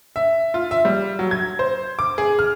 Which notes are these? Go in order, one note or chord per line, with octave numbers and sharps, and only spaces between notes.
E5
F4
E5
G3
F#3
G#6
C5
D6
G#4
F6